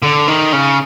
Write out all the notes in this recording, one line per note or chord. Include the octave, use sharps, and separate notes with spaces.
D3
D#3
C#3